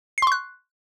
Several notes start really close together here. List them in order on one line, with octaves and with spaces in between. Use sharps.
C7 C6 C#6 F#6